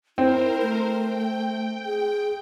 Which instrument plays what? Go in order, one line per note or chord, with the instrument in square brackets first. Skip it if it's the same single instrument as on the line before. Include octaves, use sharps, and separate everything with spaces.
[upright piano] C4 [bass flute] E4 [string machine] A#4 C5
[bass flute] A3
[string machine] G5
[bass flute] G#4